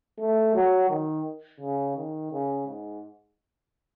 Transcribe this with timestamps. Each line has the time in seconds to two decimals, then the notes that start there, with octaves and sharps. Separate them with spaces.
0.20 A3
0.55 F#3
0.90 D#3
1.60 C#3
1.96 D#3
2.32 C#3
2.67 G#2